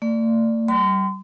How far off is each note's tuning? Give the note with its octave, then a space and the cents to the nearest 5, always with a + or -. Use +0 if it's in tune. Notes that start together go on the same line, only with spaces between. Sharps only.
A3 +45 D5 +5
G3 -35 C6 -35